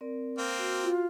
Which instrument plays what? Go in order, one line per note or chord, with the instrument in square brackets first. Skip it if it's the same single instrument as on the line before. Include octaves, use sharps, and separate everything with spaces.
[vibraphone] C4 A#4 D5
[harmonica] A#3 C4
[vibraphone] F#4
[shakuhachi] F4